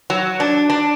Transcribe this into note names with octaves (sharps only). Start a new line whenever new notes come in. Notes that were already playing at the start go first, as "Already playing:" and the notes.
F#3
D4
D4